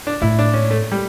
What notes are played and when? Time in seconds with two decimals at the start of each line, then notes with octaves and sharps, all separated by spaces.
0.07 D4
0.21 A2 E4
0.39 D4
0.54 C#4
0.71 A3
0.92 G3